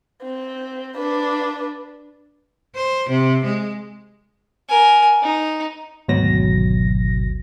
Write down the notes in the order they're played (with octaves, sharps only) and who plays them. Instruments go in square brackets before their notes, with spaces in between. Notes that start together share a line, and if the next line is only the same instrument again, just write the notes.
[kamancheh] C4
D4 B4
[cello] C5
C3
G#3
[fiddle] A#4 G#5
D#4
[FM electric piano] G#1 D2 B2 F#3 A#6